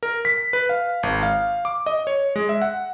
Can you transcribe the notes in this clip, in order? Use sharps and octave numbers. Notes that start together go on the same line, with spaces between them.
A#4
B6
B4
F5
G#1
F5
D6
D#5
C#5
G#3
E5
F#5